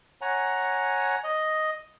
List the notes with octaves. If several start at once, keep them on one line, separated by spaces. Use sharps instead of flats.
C#5 F#5 G#5 A#5
D#5